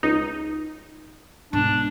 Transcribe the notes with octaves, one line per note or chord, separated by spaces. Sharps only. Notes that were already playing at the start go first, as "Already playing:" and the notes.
C#2 D#4
G#2 B2 D4